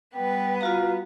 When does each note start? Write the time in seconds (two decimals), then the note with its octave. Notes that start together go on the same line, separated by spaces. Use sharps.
0.14 G3 B3 B4 G5
0.61 F4 F#4 F5 A#5